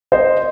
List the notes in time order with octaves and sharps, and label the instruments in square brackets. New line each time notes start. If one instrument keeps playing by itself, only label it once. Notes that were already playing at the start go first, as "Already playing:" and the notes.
[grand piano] C5 D#5